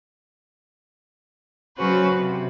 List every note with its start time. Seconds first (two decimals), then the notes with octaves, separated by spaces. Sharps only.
1.77 C#3 F#3 C#4 F#4 B4 C5
2.14 C3